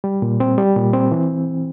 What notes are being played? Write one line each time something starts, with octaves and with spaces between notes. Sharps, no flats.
G3
A#2
C4
G3
A#2
C4
E3